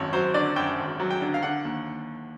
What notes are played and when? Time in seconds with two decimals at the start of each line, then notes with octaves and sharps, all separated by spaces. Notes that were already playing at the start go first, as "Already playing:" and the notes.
Already playing: G#1 F#2 C#5
0.13 F#3 C5
0.34 D3 D5
0.56 F#2 G5
0.78 G#1
1.00 F#3
1.10 G5
1.22 D3
1.34 F5
1.43 D3 F#5
1.65 D#2